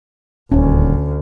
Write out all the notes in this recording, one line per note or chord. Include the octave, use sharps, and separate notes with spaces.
D#1 D2 C#4